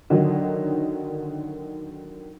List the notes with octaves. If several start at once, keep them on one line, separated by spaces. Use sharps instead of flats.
D3 D#3 F#3 D#4